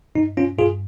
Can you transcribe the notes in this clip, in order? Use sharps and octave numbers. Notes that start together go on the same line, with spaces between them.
G2 D#4
C#4 F4
G2 F4 G#4